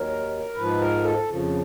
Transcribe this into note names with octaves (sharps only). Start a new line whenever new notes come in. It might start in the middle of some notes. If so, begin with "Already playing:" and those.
Already playing: D#2 D#3 F#3 A#4
G#2 F3 B4
A#4
A4
F2 C#3 F3